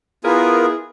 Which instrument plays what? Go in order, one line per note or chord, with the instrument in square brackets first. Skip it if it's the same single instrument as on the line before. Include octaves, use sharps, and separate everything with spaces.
[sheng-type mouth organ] B3 F4 [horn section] E4 G#4 [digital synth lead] A#4